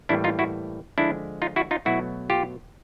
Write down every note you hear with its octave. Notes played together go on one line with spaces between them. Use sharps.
A2 E3 G3 A#3 D4 E4
D#4 F4
E4 F#4
D3 F3 G#3 D4 E4
D#4 F4
E4 F#4
D#4 F4
B2 F#3 A3 E4 F#4
F4 G4